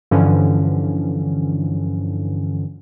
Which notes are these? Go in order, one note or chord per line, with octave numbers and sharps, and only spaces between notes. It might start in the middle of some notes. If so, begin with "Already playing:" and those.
G2 D3 E3 F3 C#4